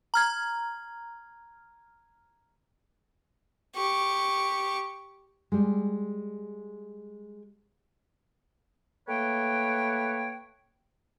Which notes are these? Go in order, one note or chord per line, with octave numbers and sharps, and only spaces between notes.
A#5 F6 G#6
G4 C#6
G3 G#3
A3 A#3 B4 C#5 G5